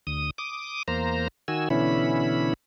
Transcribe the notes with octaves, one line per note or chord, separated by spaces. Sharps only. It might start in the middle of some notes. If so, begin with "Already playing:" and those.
D2 D#6
D6 D#6
E2 A#3 C5 A#5
D#3 F#4 G#5 E6
B2 D3 E3 C#4 E4 B5